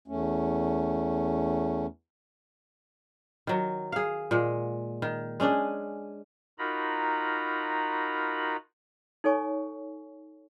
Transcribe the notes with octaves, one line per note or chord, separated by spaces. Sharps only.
E2 A3 C#4
D#3 F#3
G#4 F5
A#2 G#3
D#3
G#3 C#4 D4 G#4
D#4 F4 F#4 A#4 A#5 B5
D#4 A4 C#5 G#5 C#6